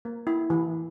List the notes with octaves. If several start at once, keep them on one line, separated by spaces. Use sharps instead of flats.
A#3
E4
E3